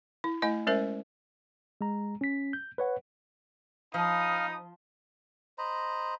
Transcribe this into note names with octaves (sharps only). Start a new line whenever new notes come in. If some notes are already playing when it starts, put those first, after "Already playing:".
E4
A3 E4 D#5 G#5
G#3 C#4 A#4 C5 E5
G#3 A#5
C#4 B6
G6
B4 C#5 F#5
F3 D#4 F5 B5 D#6
C5 D#5 A#5 B5